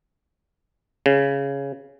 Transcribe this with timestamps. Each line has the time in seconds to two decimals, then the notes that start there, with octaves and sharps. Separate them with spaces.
1.06 C#3